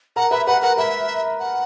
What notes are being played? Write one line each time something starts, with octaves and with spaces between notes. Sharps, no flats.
A#4 F#5 A#5
B4 E5 B5
B4 F#5 B5
A#4 F#5 A#5
B4 E5 B5
F#5